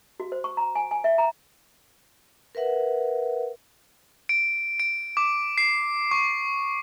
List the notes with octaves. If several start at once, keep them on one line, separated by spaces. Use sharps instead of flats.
F#4
C5
C#6
A#5
G#5
G#5
E5
A#5
A#4 B4 E5 F#5
D7
D7
D6
C7
C#6